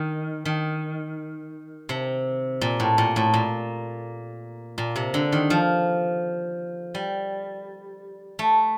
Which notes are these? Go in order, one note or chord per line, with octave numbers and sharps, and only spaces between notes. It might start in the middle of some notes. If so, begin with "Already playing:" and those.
Already playing: D#3
D#3
C3
A#2
A2
A#2
A2
A#2
A#2
C3
D3
D#3
F3
G3
A3